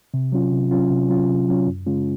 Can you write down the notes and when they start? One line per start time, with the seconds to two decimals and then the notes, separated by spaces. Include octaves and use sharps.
0.14 C3
0.32 F#3 C#4 F4
0.52 C3
0.71 F#3 C#4 F4
0.91 C3
1.10 F#3 C#4 F4
1.28 C3
1.49 F#3 C#4 F4
1.67 F#2
1.86 C#3 G#3 C#4 F4